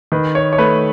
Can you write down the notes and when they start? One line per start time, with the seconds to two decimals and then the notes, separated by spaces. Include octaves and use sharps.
0.12 D#3 B4
0.35 C#5
0.53 C#5
0.58 A3 B4